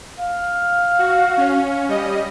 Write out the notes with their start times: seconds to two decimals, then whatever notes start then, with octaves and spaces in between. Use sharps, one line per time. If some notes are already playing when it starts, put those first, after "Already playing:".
0.19 F5
0.99 F#4
1.37 C#4
1.89 G3 D#5